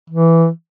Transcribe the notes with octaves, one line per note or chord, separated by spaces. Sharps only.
E3